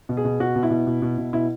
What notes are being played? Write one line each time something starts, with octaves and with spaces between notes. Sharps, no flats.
B2
G#4
B2
B2 F#4
B2
E4
B2
B2
B2
B2
B2 E4